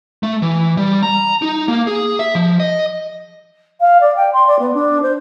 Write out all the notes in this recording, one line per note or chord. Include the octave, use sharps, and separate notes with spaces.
A3
E3
G3
A#5
D#4
A#3
G#4
E5
F3
D#5
F5
D5
G5
C6
D5
B3
D4
C5